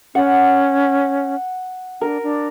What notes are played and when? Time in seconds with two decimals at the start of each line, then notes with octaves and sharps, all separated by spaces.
0.15 C#4 F#5
2.01 D4 A#4
2.23 D4